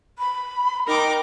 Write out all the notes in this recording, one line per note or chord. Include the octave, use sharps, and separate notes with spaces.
B5
D#4 A#4 G5 D6